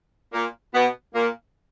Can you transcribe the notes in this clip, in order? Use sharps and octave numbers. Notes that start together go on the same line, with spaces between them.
A#2 A#3
B2 B3
A#2 A#3